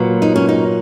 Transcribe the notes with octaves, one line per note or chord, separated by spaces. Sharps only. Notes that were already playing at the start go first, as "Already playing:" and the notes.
Already playing: A#2 F#3 B3
D#4
C#4
D#4